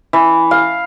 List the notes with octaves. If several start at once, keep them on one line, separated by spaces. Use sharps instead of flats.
E3
F5